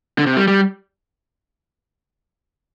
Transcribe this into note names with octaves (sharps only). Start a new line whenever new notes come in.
D3
C3
G3
G3